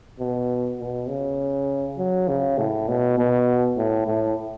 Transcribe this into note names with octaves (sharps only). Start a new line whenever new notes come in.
B2
B2
C#3
F#3
C#3
A2
B2
B2
A2
A2